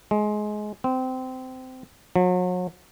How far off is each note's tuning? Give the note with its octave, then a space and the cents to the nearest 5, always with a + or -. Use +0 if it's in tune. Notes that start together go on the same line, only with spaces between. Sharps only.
G#3 +20
C4 -20
F#3 -35